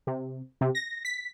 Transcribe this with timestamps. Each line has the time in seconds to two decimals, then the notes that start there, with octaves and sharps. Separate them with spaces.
0.07 C3
0.61 C3
0.75 A#6
1.05 B6